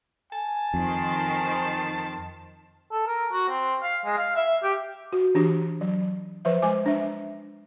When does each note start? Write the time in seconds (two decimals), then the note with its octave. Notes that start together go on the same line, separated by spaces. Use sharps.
0.32 G#5 A5
0.74 F2 D#3 C5
2.92 A4
3.07 A#4
3.32 F#4
3.48 C4
3.82 F5
4.05 G#3
4.17 F5
4.36 E5
4.63 G4
5.12 F#4
5.35 E3 D4 G4
5.81 F#3
6.45 F3 B4 C5 E5
6.62 F3 G#3 C5 G#5 D6
6.86 D4 E5